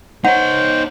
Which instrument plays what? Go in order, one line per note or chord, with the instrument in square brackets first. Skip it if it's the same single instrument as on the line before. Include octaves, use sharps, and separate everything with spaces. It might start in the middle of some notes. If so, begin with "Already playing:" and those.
[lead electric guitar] D#4 C#5 [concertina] C5 [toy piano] F#5